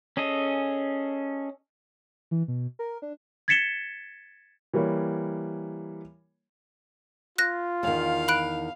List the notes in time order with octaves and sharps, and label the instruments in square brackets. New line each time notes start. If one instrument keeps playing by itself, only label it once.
[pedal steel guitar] C#4 G#4 A4 D#5
[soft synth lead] E3
B2
A#4
D4
[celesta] G#6 A6 B6 C#7 E7 G7
[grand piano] E3 G3 A#3 C#5
[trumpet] F4 [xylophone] F#6 A#6
[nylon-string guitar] E2 D#3 [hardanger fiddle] F5
[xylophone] B5 F#6 D7